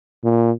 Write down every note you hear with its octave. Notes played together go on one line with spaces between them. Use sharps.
A#2